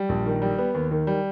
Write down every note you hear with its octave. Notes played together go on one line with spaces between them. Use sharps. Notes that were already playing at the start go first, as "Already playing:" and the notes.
Already playing: G3
A#1
D#3
G3
B3
D#2
D#3
G3